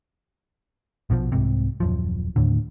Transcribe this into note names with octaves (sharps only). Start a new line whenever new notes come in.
A#1 B2 D3 F3
C2 G#2 C3
D#1 F#2 F3
D#2 A2 D3